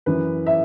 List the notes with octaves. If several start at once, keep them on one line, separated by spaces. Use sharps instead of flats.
F#2 E3 B4
E5